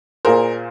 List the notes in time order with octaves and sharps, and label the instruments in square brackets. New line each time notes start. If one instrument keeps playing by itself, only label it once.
[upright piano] A#2 A#3 G#4 C5 [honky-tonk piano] A#4